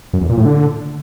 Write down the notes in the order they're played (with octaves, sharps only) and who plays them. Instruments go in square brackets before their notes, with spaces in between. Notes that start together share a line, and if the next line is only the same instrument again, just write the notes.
[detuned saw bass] F#2
E2
A#2
A2
D3